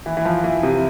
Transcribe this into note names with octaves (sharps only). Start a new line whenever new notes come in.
E3
E3
F3
E3
C3